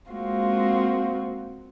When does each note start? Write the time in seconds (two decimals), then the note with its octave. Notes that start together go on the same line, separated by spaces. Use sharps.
0.11 G#3 A#3 C4 F4 F#4